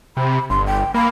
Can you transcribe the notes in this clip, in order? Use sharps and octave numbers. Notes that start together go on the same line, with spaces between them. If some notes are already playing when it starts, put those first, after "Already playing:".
C3 B5
G1 C6
G5
A#3 B5